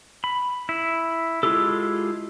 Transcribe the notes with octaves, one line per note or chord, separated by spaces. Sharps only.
B5
E4
G#3 E4 F4 G4 A4